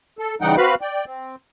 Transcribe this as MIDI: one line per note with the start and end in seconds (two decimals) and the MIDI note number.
0.19 0.35 69
0.41 0.56 49
0.41 0.56 52
0.41 0.56 55
0.41 0.56 63
0.41 0.56 78
0.41 0.56 79
0.57 0.75 60
0.57 0.75 66
0.57 0.75 71
0.57 0.75 77
0.57 0.75 83
0.81 1.05 74
0.81 1.05 79
1.06 1.36 60